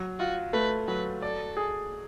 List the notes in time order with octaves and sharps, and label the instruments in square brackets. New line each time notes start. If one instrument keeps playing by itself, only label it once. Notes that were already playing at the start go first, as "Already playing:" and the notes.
Already playing: [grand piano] F#3
[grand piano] F4 [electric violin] F#4
[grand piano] A3 [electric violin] B4
[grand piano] F#3 [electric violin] B4
[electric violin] A4 [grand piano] D5
[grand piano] G#4